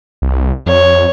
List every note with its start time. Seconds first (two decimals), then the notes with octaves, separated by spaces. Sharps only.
0.22 C2
0.66 F2 C#5